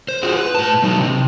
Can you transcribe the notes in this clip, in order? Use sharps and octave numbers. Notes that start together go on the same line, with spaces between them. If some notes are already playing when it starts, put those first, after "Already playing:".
C5
F4 F#4 G#4
B4
A2 A5
F#3 D#4
C3